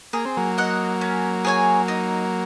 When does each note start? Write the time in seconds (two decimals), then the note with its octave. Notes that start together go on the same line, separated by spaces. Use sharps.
0.13 A#3 G#4
0.25 C4
0.37 F#3 A#3
0.58 D#5 F#5
1.01 C#4
1.45 G#4 C#5 G#5
1.88 D#4